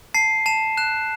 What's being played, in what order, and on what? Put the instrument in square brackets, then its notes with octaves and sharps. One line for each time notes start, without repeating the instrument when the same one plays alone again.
[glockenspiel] A5 C7
A5 E7
F#6 E7